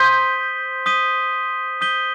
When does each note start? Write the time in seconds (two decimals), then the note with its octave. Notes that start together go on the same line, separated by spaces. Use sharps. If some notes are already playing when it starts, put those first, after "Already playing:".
Already playing: C5 D#6 G6 B6 D#7 G7
0.86 D#6 G6 B6 D#7 G7
1.81 D#6 G6 B6 D#7 G7